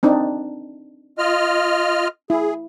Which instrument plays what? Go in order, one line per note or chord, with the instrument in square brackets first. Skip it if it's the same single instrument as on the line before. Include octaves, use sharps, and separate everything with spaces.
[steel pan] C4 D4 D#4
[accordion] F4 D#5 F6
[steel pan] E4 [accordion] G#4